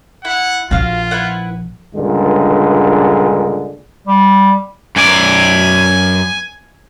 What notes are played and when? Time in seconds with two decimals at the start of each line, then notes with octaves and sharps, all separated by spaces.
0.25 E4 F#5
0.71 A#1 F3 F4 F#4 F5
1.11 E4 B4 F#5
1.95 C#2 G2 A#2 D3 G#3
4.07 G3
4.96 F#2 D5 G#5